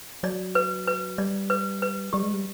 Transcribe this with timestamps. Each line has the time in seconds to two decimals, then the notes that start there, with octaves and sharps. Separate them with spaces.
0.23 F#3 D5
0.55 B4
0.88 B4
1.18 G3 D5
1.50 B4
1.82 B4
2.13 G3 G4
2.23 G#3
2.33 G3